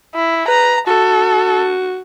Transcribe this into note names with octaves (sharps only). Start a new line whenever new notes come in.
E4
B4 A#5
F#4 A4